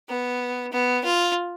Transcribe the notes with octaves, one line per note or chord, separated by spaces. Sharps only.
B3
B3
F4